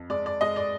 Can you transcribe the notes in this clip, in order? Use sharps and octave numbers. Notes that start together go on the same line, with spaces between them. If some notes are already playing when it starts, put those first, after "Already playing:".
Already playing: F2
G#3 D5
D5
G#3 D#5
D5